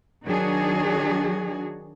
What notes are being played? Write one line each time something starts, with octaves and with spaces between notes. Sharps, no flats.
D#3 F#3 D4 F#4 G#4